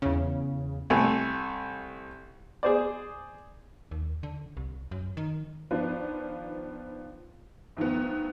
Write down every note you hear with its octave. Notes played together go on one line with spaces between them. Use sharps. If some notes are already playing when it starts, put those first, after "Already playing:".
E2 C#3
C2 A3 G#5
G#4 C5 D5
D#2
D3
C2
F#2
D#3
D#3 F3 B3 D4 F4 B4
D2 D#3 F3 B3